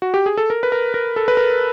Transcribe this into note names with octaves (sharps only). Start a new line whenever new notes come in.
F#4
G4
G#4
A4
A#4
B4
A#4
A#4
A4
B4
A#4